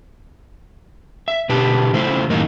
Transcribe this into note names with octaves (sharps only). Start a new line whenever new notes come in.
E5
B2 D3 G4 B4 A5
C#3 F3 A3 E4 C5
F#2 A2 D#3 A#3 D#4